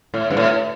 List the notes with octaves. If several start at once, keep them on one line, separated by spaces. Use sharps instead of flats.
A2
G2
A2